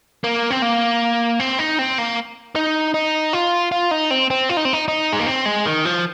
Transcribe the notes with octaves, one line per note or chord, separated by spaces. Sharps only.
A#3
C4
A#3
C4
D#4
C4
A#3
D#4
D#4
F4
F4
D#4
C4
C4
F4
D#4
C4
D#4
D#4
G#3
A#3
C4
G#3
D#3
F3